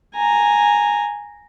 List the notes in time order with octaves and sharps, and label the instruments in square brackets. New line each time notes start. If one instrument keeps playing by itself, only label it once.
[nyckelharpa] G#5 A#5